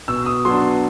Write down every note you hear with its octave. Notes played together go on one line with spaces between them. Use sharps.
B2 E6
D#6
F#3 B3 D4 C6